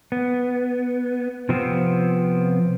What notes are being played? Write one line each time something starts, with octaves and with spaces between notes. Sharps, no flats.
B3
C3 F3 B3 C4